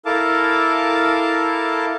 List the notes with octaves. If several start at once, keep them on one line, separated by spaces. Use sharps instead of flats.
E4 A4 A#4 F5 A5 D6